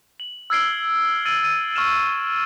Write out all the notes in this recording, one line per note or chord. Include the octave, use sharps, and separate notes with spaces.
F#7
E6 F6 G#6 C7 D7 G7
E6 A6 D7 D#7 F#7
E6 A6 D#7
C#6 F6 E7